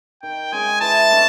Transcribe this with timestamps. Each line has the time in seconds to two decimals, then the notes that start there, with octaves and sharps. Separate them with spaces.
0.23 D#3 G5
0.52 G#3 C#4 G#5
0.81 E3 A5
1.10 A3 D4